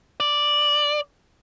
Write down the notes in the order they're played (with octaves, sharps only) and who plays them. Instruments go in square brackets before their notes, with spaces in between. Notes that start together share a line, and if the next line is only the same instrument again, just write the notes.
[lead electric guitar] D5